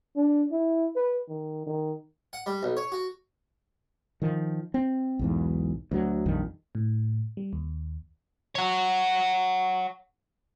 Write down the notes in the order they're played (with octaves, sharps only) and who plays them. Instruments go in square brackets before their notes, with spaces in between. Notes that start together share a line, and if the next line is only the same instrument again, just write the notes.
[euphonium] D4
E4
B4
D#3
D#3
[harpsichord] F#5
G3
B1
C#5
F#4
[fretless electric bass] D#3 F3
C4
B1 E2 G#2
D2 F#3
A#1 F2 D#3 G3
[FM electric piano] A2
G3
D#2
[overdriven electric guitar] C#5 F#5